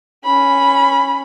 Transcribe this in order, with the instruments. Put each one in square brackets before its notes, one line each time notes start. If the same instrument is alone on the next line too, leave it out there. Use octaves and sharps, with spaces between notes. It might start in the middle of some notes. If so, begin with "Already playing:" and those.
[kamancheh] C#4 B5